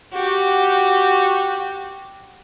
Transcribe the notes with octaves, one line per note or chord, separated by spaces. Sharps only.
F#4 G4